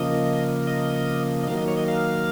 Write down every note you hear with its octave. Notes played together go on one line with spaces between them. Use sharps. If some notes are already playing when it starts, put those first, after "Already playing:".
Already playing: C#3 F3 A#3 D#5
D#5
D#5
D#3 F#3 A#3 F5
D#5
C#5
D#5
F5